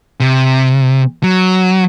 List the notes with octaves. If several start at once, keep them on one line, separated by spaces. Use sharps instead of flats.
C3
F#3